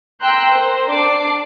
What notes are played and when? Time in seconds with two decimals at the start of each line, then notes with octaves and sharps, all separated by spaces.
0.22 G5 A#5 C6 E6 F#6 G6
0.52 A#4 C5
0.90 D4 D5 D6 C7